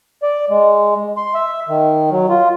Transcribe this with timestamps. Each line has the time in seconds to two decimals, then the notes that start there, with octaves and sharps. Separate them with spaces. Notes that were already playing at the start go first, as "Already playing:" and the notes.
0.23 D5
0.50 G#3
1.17 C6
1.35 E5
1.69 D#3
2.11 F#3
2.29 F4